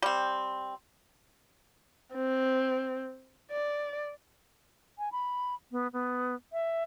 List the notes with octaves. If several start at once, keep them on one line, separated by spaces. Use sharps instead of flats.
G3 C4
C4
D5
G#5
B5
B3
B3
E5